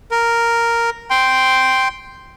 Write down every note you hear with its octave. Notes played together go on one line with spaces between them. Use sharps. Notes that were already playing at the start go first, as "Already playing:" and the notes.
A#4
G5 C6